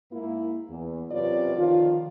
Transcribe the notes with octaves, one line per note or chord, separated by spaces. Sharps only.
G#2 A#3 E4
E2
F#2 C3 F4 B4 C#5 D5
D2 D#3 F3 F4